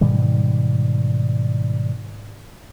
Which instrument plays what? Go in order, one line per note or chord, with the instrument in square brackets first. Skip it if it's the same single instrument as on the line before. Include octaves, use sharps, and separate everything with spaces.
[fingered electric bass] G#2 B2 D#3 G3